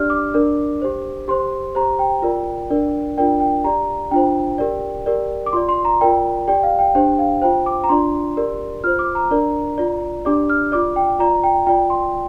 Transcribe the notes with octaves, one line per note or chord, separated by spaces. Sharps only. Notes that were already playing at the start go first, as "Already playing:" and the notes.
Already playing: D4 G4 D5 F6
D6
D4 A#4 D5
G4 C5
G4 C5 C6
G4 C5 A#5
G5
F4 A#4 D5
D4 A#4 D5
D4 F4 A#4 D5 G5
G5
G4 D5 A#5
D4 F4 C5 G5
G4 A#4 D5
G4 A#4 D5
D6
F4 D5 C6
C6
A#5
F4 A#4 D5 G5
G4 D5 G5
F5
G5
D4 G4 C5 G5
F5
F4 C5 G5
D6
A#5
D4 F4 D5 C6
G4 A#4 D5
F4 C5 F6
D6
A#5
D4 A#4 D5
F4 D5
D4 G4 D5 D6
F6
F4 D5 D6
G5
F4 D5 A#5
G5
F4 D5 G5
C6